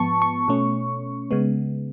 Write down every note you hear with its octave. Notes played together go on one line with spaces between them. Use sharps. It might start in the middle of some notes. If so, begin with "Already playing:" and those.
Already playing: G#2 F3 B3 A5 C#6
C#6
B2 A3 C#4
C#3 G#3 B3